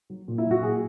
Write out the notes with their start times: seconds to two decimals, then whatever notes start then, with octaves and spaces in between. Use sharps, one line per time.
0.10 F#3
0.28 A#2
0.38 E4
0.45 F#3
0.51 F#4
0.63 A#2 G#4